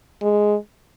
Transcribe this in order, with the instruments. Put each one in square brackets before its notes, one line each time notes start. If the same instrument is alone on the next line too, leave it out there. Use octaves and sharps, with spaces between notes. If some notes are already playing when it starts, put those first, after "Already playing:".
[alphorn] G#3